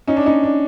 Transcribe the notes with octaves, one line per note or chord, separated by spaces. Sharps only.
C#4 D#4
D4
C#4 D#4
D4